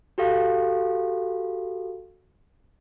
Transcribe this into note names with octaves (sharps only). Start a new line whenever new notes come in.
F#4 G4 A4 F5